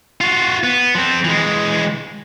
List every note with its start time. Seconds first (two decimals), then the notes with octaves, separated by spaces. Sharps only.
0.21 F4 F#4
0.64 B3
0.95 F3 C4
1.24 E3 G#3